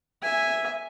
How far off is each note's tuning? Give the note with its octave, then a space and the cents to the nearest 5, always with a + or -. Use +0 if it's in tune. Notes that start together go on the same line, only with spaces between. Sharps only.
E5 +0 G#5 -5